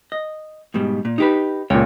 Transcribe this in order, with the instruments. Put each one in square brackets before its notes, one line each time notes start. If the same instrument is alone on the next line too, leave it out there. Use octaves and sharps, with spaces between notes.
[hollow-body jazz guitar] D#5
G#2 B2 G3
A#2
D#4 G4 B4
[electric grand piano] C#2 A#2 [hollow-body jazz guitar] C#5 G5